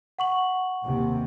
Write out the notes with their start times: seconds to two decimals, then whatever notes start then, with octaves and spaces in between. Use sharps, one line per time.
0.19 F#5 C#6 F#7
0.85 D#2 C3